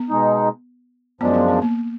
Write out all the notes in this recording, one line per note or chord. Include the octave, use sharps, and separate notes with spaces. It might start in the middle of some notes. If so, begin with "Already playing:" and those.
Already playing: B3
B2 G#3 D#4
F#2 F3 G#3 B3 D4
B3
B3
A#3